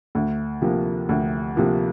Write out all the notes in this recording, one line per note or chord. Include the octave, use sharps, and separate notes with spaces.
D2
C3 F3 A#3
D2
C3 F3 A#3